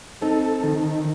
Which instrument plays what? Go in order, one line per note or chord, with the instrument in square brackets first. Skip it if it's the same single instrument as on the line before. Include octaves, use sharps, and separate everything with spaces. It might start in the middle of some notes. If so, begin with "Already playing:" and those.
[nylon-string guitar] C4 D#4 [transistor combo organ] A4
[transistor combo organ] D#3